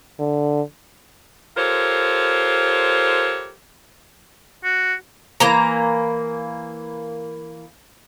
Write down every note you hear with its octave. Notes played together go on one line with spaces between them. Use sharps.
D3
F4 G4 A4 A#4 C5 C#5
F#4
E3 A#3 A#5